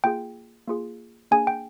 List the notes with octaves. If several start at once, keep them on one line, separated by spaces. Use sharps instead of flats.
A#3 F4 G#4 G5
A#3 F4 G#4
A#3 D4 G#4 G#5
G5